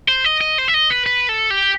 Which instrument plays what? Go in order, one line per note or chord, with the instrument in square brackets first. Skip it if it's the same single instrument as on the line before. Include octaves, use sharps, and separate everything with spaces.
[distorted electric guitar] C5
D#5
D#5
C5
E5
D#5
B4
B4
A4
G4